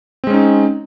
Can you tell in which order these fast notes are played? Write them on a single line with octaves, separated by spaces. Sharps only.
C4 G#3 C#4 D#4